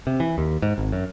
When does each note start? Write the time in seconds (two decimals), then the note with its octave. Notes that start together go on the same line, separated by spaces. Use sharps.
0.07 C3
0.20 E3
0.38 D#2
0.62 G#2
0.78 G#1
0.92 F#2